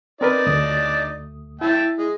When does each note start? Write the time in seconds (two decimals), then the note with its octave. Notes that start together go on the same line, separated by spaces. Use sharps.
0.21 C4 D4 D#4 A#4 B4 D5
0.47 D2 A3 D#6
1.61 E4 E5 G5 A5
1.98 G#3